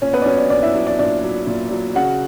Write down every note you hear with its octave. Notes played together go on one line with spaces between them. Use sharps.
A#2 C#4 C#5
B3 B4
D5
F#3 C#4 C#5
D4 D5
A#2 D4 D5
E4 E5
F#3 E4 E5
D4 D5
A#2 D4 D5
F#3
A#2
F#3
C#3 F#4 F#5